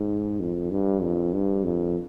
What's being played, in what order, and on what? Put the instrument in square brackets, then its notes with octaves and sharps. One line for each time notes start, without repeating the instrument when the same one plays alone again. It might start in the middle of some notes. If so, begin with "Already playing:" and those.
Already playing: [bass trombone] G#2
F2
G2
F2
G2
F2